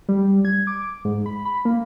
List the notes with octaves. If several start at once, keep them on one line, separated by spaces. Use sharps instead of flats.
G3
G#6
D6
G#2
B5
B5
A#3